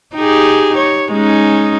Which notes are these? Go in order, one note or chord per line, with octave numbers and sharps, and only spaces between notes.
D#4 G4 G#4
C#5
G#3 C#4 D#4